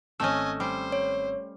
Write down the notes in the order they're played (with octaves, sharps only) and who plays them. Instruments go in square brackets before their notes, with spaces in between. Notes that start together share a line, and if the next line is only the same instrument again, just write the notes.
[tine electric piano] G#1 C4 E6 [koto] A3 C#4 [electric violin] D#5 G#5
[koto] G3 [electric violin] C5
[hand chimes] C#5